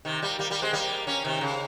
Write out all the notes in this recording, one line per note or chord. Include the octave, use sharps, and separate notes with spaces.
C3 D#3
G3 A#3
G3 A#3
G3 A#3
G#3 C4
G3 A#3
A#3 C#4
C3 D#3
C#3